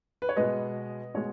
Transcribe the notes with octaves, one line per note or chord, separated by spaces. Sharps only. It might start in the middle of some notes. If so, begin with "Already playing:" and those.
B4
C#5
B2 G#3 B3 B4 D#5
B2 G#3 C#5